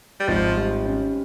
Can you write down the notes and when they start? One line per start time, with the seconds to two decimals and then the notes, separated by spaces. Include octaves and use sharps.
0.20 G3
0.28 G#1 F3
0.57 G3
0.85 C#4